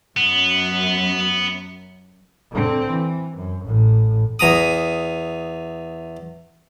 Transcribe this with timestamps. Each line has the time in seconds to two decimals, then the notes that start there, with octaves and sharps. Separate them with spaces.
0.17 F#2 F#3 B3
2.51 D3 C4
2.91 E3
3.38 F#2
3.66 A1 A2
4.39 E2 A#5 D#6